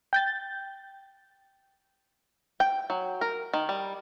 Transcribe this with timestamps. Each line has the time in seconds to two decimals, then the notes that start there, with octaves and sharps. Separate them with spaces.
0.13 G5 G6 A6
2.60 G5
2.90 F#3
3.21 A#4
3.54 D#3
3.69 G3